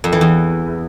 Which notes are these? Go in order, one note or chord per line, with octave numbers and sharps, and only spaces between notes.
F2
E3
E2